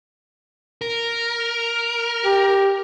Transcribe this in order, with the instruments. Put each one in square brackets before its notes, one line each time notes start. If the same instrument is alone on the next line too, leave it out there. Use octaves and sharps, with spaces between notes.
[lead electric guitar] A#4
[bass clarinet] G4